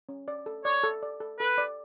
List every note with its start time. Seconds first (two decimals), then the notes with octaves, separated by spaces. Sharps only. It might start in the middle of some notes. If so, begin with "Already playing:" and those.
0.09 C#4
0.28 D5
0.46 A4
0.65 C#5 D5
0.84 A4
1.03 D5
1.20 A4
1.39 A4 B4
1.58 D5